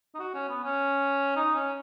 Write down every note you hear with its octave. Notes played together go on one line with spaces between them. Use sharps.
D#4
F#4
C#4
B3
C#4
D#4
C#4